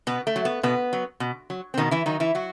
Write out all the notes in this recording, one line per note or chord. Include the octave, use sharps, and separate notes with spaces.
B2 B3
A3
F#3
B3
B2 B3
F#3
B2
F#3
C4
B2 D#3 D#4
E3 E4
D#3 F#3 D#4
E3 E4
F#3 F#4